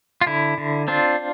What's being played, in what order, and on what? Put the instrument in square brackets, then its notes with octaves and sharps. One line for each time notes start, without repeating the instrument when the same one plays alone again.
[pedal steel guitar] F4
D3 E4
D3
C4 D4 F4